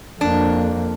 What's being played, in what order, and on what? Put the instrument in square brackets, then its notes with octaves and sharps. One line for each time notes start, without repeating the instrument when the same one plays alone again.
[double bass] F2 A#3 [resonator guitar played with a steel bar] D4